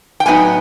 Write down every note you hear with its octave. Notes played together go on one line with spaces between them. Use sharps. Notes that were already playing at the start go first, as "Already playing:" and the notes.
G5
A2 F#3 B3 D#4 G#5